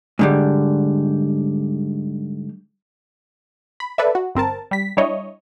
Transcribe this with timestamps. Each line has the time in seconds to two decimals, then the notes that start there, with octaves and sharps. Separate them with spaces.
0.19 G#2 D3 G3
3.80 B5
3.98 A4 B4 D5 E5
4.15 F#4
4.35 G1 C4 A#4 A5
4.71 G3 B6
4.97 G3 D4 E4 C#5 D#5